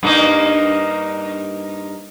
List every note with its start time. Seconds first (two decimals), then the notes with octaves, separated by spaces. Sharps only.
0.03 G2 A#3 D#4